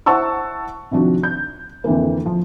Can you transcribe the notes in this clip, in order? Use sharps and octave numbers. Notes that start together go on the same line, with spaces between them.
E4 C5 F#5 A5 C#6 E6
C3 D#3 F3 D4 F#4
G6
F2 D3 E3 A#3
F3